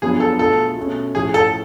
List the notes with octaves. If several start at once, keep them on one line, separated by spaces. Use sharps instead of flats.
F#2 F3 B3 D4 F4 G#4
A4
B2 A3 F4 G#4 A4
B2 A3 C#4
A2 F3 A3 G#4
A4